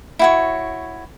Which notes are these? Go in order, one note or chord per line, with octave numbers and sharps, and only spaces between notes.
E4 F#4 C#5